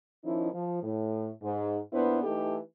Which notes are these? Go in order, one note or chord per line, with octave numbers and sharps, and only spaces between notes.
D#3 F3 C#4 D#4 E4
F3
A2
G#2
A#2 B3 D4 E4 B4 C5
E3 A3 D#4 G4 A4